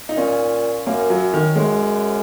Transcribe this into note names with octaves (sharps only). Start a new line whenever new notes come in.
D#4
A#2 C#4
F#2 A#3
F#3
D#3
F#2 G#3